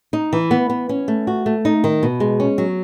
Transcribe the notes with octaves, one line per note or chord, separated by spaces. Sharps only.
D#4
E3
B3
B3
C#4
A3
F#4
A3
D#4
D#3
B2
G#3
C#4
F#3